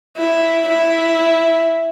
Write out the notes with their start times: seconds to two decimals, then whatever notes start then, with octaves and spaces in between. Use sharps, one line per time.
0.18 E4
0.69 E4